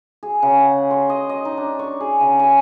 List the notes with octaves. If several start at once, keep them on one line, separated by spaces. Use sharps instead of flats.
G#4
C#3
F#5
C6
D#5
D#5
D#4
D4
C#6
G#4
C#3
G#5